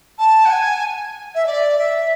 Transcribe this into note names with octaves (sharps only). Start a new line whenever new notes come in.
A5
F#5
G#5
E5
D5
E5